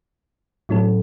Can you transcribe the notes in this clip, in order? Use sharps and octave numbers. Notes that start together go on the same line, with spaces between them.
A2 F#3 C#4 E4 A4